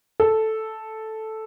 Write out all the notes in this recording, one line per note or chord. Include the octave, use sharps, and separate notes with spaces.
A4